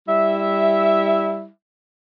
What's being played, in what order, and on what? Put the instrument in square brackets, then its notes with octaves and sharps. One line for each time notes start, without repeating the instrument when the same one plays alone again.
[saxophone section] G3 E4 E5